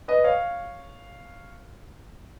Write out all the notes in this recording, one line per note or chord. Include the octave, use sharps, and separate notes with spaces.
B4 D#5
C#5 F5